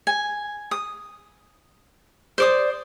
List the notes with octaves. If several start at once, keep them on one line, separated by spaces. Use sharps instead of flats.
G#5
D#6
C5 D5 D#6